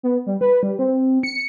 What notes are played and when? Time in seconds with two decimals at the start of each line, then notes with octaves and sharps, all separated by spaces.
0.03 B3
0.27 G3
0.41 B4
0.63 G3
0.79 C4
1.23 C#7